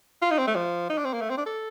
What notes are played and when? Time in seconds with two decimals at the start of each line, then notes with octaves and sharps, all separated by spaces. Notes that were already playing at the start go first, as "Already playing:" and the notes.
0.22 F4
0.31 D#4
0.38 C4
0.47 A3
0.55 F3
0.90 D#4
0.98 D4
1.05 C4
1.13 A#3
1.21 A3
1.30 C4
1.38 D4
1.46 A4